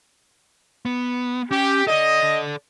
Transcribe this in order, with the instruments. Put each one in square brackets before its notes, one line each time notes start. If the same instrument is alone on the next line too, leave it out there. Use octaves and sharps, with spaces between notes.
[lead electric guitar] B3
[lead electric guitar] C#4 [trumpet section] G4
[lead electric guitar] A4 D5 [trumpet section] D#5